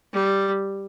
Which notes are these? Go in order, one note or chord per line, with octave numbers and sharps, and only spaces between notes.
G3